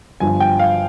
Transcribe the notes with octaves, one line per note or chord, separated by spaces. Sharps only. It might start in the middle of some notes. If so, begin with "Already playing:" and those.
G1 G2 F3 G#5
G5
F5